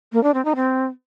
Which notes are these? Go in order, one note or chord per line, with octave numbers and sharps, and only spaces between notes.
A#3
D4
C4
D#4
C4